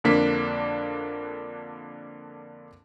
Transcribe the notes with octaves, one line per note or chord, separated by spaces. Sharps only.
F2 D3 A#3 D4 B6